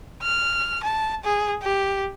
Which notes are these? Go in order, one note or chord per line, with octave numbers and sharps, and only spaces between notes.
F6
A5
G#4
G4